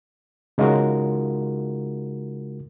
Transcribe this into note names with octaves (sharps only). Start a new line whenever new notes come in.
C#3 G#3 D#4 F4 F#4 A#4